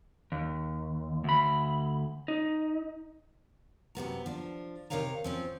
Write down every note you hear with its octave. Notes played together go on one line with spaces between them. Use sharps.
D#2
D2 B5
D#4
F#2 C3 B3 A#5
F3 D4
C3 D#4 A#4 C#5 F5 A#5
F3 C4 C#4